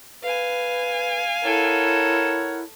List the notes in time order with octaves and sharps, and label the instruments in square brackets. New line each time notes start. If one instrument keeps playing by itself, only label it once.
[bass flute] B4 [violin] F5 G#5
[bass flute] E4 [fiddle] A4 [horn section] A#4 C#5 F#5